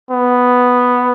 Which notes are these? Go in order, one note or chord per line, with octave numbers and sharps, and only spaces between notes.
B3